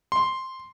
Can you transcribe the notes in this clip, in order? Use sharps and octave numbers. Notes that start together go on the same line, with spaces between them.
C6